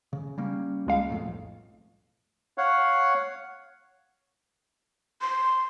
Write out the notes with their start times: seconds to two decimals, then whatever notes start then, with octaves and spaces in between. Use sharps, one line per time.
0.13 C#3
0.38 G3 A#3 C#4
0.87 C#2 G#3 F5
1.10 B1 F2 A2
2.58 C#5 F5 F#5
5.22 C6